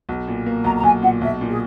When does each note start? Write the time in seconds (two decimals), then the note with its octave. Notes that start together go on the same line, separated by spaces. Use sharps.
0.09 B1
0.28 A#2
0.46 A#3
0.64 B1 A#5
0.77 A#5
0.83 B1 G#5
1.02 A#2 F#5
1.21 B1 E5
1.41 A#2
1.50 G#4